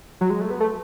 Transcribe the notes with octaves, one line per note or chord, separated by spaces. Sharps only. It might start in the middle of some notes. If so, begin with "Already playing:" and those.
F#3
G#3
A3
B3
A3